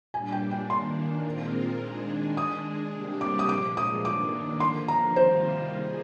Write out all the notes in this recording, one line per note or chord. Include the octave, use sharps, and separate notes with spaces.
A#2 G3 D4 G#5
G5
G5
D#3 A#3 D4 C6
A#2 G#3 C4 F4 A#4
D#3 G#3 D4 G#4
G#3 D4 G#4 D#6
C3 G3 A#3 D4 G4
D6
D#6
A#2 F3 G#3 D6
D#6
D#3 A#3 D4 D6
D3 F3 A#3 C6
A#5
C3 D#3 G3 A#3 F4 C5
G#4